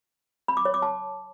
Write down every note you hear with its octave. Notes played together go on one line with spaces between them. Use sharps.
B5
D6
C#5
D6
A5